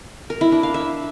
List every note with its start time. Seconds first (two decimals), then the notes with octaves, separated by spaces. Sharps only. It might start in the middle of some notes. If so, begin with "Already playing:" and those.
0.30 A#4
0.41 E4
0.52 D4
0.63 F5
0.74 E5